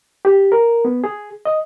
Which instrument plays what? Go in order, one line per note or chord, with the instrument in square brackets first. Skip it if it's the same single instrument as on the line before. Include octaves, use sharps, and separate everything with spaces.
[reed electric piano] G4
A#4
B3
G#4
D#5